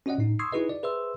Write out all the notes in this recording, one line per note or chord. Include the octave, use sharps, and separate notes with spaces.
C#4 F#4 D5 D#5 F#5
A2 D#4
C6 C#6 D#6 E6 G#6 C7
D#4 E4 F#4 G#4 B4 D#5
D5
G#4 B4 C5 E5 C6 E6